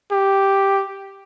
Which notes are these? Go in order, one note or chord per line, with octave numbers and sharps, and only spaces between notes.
G4